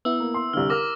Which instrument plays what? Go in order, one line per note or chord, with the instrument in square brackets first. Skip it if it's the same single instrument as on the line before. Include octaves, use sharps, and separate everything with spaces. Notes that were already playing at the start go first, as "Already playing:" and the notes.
[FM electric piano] B3 E4 [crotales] E6
[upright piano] A#3
C6
[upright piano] C2 D3 [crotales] F6
[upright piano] A#4 F6 [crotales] D6 A#6